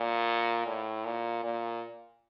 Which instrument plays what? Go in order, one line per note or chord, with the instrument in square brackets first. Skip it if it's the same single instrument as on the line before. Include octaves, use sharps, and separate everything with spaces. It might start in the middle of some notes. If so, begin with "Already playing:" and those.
Already playing: [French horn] A#2
A2
A#2
A#2